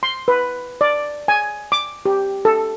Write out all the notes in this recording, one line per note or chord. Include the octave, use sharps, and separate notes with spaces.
C6
B4
D5
G#5
D6
G4
A4